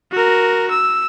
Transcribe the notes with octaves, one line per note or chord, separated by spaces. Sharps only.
F#4 A#4
E6